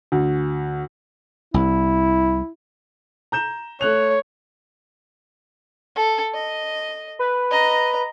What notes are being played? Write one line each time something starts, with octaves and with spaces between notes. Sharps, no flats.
D2
C2 E4
A#5 G6 E7
A3 C#5 F#6 F7
A4
D#5
B4
D#5 A#5